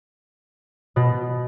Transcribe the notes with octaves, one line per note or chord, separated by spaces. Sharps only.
B2